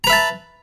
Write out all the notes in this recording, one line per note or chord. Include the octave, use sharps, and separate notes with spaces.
B4 E5 A5 A#5